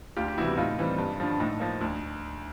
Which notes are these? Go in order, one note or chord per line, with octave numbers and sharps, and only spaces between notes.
D2 F4 G4
G4
C3 E3 G3 B3 E4 F#4
A2 D#4 F4
E3 G3 C4
G2
D3 F3
A2 D#4
F3 A#3
D2